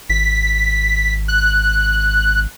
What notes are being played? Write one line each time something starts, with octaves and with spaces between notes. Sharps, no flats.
G#1 B6
F#6